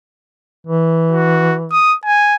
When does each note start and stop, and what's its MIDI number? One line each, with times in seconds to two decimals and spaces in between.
0.67 1.77 52
1.11 1.56 66
1.72 1.95 87
2.05 2.36 80